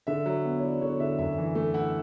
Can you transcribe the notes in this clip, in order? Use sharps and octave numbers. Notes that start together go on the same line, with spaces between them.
D3 E5
F#3
B3
C#5
E4 D5
D3 C#5
D3 E5
F#2 E5
E3
A3
E4 F#5